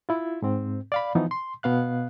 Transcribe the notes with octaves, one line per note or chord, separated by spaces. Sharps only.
E4 F4
G#2 C4
D5 F5 B5
E3 F3 B3 D#4
C6
B2 B3 F5 F#6